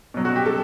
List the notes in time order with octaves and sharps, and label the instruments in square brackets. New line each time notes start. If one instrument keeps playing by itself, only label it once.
[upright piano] B2 F#3
F#4
G4
A4